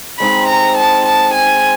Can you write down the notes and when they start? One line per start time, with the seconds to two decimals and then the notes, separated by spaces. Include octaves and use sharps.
0.20 G#3 C4 D#4 B5
0.48 A#5
0.77 A5
1.06 A5
1.34 G#5